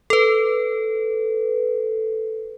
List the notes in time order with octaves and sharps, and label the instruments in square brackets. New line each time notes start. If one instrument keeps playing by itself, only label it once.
[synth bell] A4 B4